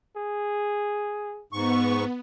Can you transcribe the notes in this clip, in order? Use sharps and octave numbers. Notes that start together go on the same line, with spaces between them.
G#4
G#2 B3 C#6